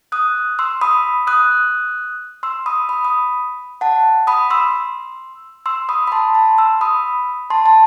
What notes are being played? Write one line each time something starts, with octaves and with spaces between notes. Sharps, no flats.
D#6 F#6
C6 E6
B5 D#6
D#6 F#6
C6 E6
B5 D#6
B5 D#6
B5 D#6
F#5 A5
B5 D#6
C6 E6
C6 E6
B5 D#6
B5
A5 C6
A5 C6
C6 E6
B5 D#6
A5 C6
A5